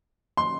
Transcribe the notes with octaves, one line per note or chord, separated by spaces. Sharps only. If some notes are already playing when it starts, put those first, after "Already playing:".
C6